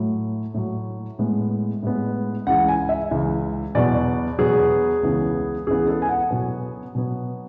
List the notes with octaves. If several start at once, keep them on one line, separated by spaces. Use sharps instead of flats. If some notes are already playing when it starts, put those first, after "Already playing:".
Already playing: A2 F#3 A3
A2 F#3 A3
A2 G#3 B3
A2 G#3 B3
C#2 C#3 E3 G#3 F#5
G#5
E5
C#2 C#3 E3 G#3
E2 B2 F#3 B3 D5
E2 B2 F#3 B3 G#4
C#2 C#3 E3 B3
C#2 C#3 E3 B3 G#4
A4
G#5
F#5
B2 F#3 B3
B2 F#3 B3